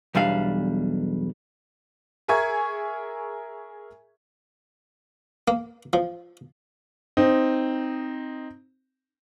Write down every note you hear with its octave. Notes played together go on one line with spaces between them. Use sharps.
B1 E2 G3 D4 F5
G#4 A#4 E5 G#5 C#6 G#6
A#3
F3
C4 D#4